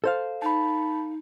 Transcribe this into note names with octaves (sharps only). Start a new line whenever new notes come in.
A4 C5 F5
D#4 A5 B5